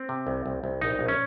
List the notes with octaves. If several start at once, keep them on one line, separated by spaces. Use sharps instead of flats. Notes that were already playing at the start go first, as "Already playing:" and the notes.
Already playing: C4
C3
C2
C2
C2
A#1 D#4
A#1
C#4